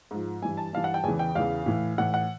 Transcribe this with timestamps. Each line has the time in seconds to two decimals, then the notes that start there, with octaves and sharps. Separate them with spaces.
0.11 G#2 F3
0.42 G2 E3 G#5
0.57 A5
0.73 G2 E3 F5
0.84 F#5
0.94 G5
1.04 E2 C#3 E3 G#5
1.19 G5
1.35 E2 C#3 E3 F5
1.66 A2 E3
1.98 A2 E3 F#5
2.14 F#5